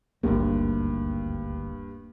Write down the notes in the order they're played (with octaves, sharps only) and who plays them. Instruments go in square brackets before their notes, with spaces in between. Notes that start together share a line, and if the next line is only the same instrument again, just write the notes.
[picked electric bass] D#1 G#1 D2 [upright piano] G2 [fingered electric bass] A#3